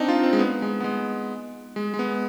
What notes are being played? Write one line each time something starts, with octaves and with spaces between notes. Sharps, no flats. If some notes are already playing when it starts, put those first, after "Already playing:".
Already playing: C4 D4 D#4
F4
C4
G#3
B3
G#3
B3
G#3
G#3
G#3
B3